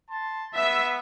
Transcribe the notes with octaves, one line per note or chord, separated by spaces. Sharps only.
A5 C6
B3 E5